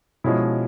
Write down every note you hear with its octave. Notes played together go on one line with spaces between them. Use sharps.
B2 F3 G#3 C#4 E4